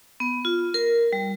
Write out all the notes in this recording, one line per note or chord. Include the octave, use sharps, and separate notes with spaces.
B3
F4
A#4
G3